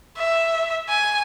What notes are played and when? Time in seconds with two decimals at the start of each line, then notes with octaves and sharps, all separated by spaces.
0.17 E5
0.89 G#5